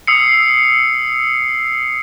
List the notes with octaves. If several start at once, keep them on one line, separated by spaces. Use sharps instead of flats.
D#6 E6 C7 C#7